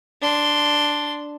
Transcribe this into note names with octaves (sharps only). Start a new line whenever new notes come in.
D4 C6